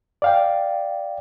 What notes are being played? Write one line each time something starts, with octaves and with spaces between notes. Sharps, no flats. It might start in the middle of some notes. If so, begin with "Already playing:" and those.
D5 F5 G5